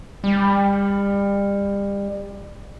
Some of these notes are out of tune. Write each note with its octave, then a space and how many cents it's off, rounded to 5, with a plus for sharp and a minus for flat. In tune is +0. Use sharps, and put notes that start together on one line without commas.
G3 +30